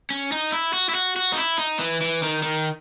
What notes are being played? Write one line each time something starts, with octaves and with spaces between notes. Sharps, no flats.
C#4
D#4
E4
F#4
E4
F#4
F#4
D#4
E4
D#4
E3
E3
D#3
D#3